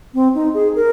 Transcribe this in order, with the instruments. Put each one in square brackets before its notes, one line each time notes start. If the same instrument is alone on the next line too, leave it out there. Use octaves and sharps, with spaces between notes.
[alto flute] C4
D#4
G#4
A#4